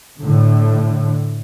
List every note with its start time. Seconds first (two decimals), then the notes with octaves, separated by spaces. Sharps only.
0.18 A2 D3